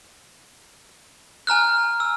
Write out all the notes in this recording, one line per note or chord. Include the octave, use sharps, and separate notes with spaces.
G#5 A#5 F6 F#6
E6